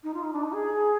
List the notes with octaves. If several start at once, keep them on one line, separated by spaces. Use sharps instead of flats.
D#4
F4
D#4
D4
D#4
G#4